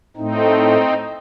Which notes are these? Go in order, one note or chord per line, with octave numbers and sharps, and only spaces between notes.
A2 A3 C4 D#4